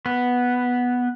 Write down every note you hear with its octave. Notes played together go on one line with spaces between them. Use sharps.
B3